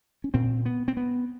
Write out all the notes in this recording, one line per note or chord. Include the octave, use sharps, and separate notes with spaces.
C#4
A#2 C4
B3
C4
B3